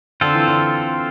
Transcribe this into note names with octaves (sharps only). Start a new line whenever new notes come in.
D3 C4 F4 A4 C5
E3
D3